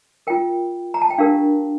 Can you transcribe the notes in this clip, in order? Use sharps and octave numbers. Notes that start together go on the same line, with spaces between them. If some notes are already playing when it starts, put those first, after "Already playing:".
F4 A#4 G5
A#5
A5
G5
D4 G4 A#4 F5